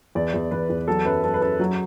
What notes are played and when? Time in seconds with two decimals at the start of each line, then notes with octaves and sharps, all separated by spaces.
0.15 E2 D5
0.34 E2
0.51 E2 B4
0.70 E2
0.88 F#3 A4
1.05 F#2 B4
1.23 F#2 A4
1.34 B4
1.41 F#2 A4
1.59 F#3